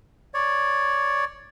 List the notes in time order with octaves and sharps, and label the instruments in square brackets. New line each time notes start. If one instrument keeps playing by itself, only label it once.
[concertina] C#5 D5